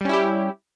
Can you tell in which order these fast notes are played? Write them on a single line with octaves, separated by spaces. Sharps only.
G3 C#4 E4 G4